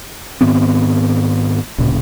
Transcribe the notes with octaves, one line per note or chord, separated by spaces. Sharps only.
G#2 D#3 B3 C4
D1 A#2 C#3